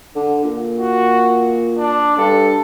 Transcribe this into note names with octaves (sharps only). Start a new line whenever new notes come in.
D3
A#2
F#4
D4
G2 A4